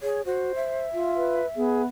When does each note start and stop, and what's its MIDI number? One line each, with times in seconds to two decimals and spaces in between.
0.01 0.22 68
0.01 0.22 73
0.26 0.52 66
0.26 0.87 72
0.55 1.85 76
0.94 1.40 65
1.16 1.46 71
1.56 1.86 59
1.56 1.82 68